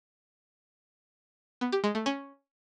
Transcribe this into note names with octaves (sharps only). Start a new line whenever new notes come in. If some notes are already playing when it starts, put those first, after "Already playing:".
B3
G4
G#3
A3
C#4